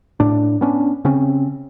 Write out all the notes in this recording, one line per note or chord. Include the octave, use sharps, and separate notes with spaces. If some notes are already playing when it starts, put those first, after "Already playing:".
A2 D4
B3 C#4 D4
C#3 C4 C#4